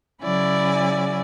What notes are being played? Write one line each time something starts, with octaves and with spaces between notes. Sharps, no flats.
C#3 F#3 E4 D5 G#5